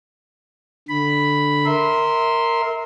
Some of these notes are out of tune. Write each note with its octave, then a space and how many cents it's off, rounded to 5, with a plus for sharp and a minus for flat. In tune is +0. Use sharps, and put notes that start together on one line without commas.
D3 +0 B5 +0
A#4 -10 E5 -25 C6 +0